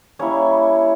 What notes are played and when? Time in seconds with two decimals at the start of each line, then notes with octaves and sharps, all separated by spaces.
0.19 G3 A#3 C#4 E4 C#5